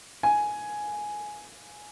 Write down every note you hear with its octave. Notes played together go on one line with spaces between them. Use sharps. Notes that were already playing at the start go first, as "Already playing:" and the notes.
G#5